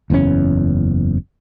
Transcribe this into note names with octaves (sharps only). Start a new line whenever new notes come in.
F#1 E2 C3 C#4